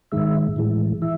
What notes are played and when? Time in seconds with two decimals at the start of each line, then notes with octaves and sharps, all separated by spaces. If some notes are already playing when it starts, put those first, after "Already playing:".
0.12 G#2 D#3 G#3 E5
0.56 A2 E3 G#3
1.02 E3 E5